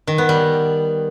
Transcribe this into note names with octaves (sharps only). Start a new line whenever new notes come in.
D#3
B3
G3